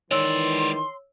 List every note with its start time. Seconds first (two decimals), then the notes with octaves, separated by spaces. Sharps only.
0.11 D#3 E3 G#3 C#5 D5 C6 E6